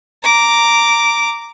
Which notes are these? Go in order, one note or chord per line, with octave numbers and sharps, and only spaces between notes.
A#5 D6